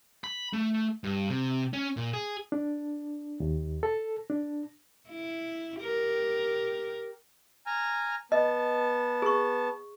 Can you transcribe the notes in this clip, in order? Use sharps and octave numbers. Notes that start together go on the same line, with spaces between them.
B5
A3
G2
C3
C#4
A#2
G#4
D4
D#2
A4
D4
E4
G4 A#4
G#5 A#5 F6
B3 D#5 A5
G#4 C#6